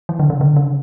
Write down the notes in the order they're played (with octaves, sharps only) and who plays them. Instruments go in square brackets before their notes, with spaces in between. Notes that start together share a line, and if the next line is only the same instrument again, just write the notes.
[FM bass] E3
D3
C#3
D3
C#3